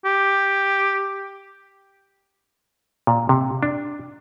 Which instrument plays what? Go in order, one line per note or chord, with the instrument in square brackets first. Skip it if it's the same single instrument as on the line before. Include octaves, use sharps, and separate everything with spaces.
[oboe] G4
[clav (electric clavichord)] A#2
C3
D4